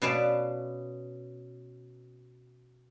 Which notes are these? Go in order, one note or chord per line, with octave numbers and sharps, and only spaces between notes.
B2 C#4 B4 D5 F5 A5